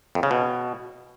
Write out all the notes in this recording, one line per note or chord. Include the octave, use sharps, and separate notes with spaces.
F2
C#3
B2